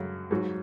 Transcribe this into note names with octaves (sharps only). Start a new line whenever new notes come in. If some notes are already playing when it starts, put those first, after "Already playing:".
Already playing: F#2 C#3 F#3
G#2 F#3